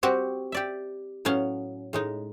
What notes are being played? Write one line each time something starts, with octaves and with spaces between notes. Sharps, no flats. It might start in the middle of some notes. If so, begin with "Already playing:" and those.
G3 C4 F#4 G4
G4 D5 E5
A2 F#3 B3 C#4 F5
A2 G#3 D#4